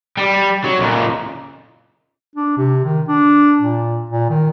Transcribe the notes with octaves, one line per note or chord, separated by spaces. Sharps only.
G3
F#3
C#2 A#2
D4
C3
D#3
D4
A#2
A#2
D#3